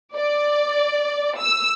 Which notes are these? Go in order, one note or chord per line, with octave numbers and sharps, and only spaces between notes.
D5
E6